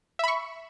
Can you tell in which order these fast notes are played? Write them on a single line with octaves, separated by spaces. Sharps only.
E5 B5 C#6